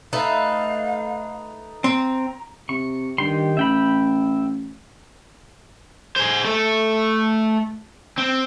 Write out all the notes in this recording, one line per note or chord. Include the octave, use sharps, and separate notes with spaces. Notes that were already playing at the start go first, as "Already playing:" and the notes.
A3 D#4 B4 F5
C4 A#5
C3 C#6
G2 D#3 G4 C6
A1 E5 G5 B5
G#4 C5
A3 A4
C4